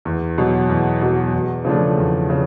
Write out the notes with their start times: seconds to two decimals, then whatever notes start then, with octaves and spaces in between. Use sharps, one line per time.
0.05 E2
0.38 B2 F#3
0.69 E2
1.01 B2 F#3
1.33 E2
1.65 C#3 F3 A3 D4
1.98 E2
2.30 C#3